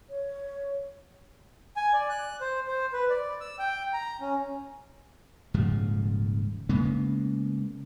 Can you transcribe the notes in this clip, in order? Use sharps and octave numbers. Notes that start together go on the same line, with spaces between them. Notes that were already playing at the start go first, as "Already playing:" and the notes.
C#5
G#5
D5
F#6
C5
C5
B4
D5
E6
G5
A#5
C#4
D#1 G#2 C#3 F3
C#3 G#3 A#3 B3